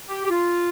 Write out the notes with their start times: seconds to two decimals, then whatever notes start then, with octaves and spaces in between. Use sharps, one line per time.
0.09 G4
0.25 G4
0.30 F4